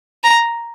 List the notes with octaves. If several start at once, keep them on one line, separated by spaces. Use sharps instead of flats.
A#5